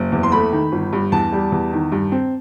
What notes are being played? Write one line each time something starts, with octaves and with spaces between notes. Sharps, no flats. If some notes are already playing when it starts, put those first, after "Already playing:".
Already playing: F#1
E2
C6
A3 B5
D#3
G1
G2
E2 A5
G3
E2
D#3
G2
C4